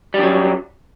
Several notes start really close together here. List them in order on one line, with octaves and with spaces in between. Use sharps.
G3 F#2 F#3